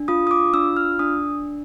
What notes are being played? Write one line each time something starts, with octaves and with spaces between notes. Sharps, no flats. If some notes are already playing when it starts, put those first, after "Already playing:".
Already playing: D4
F4 D#6
D#6
D6
D4 E6
F6
D4 D#6